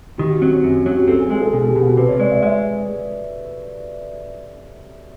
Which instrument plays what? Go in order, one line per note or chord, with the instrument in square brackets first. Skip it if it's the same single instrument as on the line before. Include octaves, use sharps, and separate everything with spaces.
[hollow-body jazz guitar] D#3 [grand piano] G4
[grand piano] F#4
[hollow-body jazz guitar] F#3 [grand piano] C4
[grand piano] C#4
[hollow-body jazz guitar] F#2
[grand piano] C#4
[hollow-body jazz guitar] F#3 [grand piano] C#4
[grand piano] F#4
G4
[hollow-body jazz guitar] C4 [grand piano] A4
[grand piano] G#4
[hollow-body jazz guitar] G#3 [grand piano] G#4
[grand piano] A4
[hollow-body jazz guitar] B2 [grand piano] G#4
[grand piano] G4
[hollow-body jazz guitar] B2
[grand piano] F#4
[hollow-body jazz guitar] C3 [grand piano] B4
[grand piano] C#5
[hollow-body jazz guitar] G#3 [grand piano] D5
[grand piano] E5
[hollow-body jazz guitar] G#3 [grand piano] E5